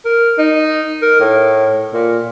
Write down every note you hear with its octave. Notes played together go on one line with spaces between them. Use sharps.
A#4
D#4
A#4
A2
A#2